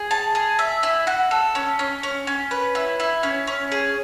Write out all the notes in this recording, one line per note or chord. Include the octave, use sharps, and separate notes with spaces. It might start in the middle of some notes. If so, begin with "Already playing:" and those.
Already playing: G#4
A5
G#4
E5
E4
F#4
A4
C#4
C#4
C#4
C#4
B4
E4
E4
C#4
C#4
G#4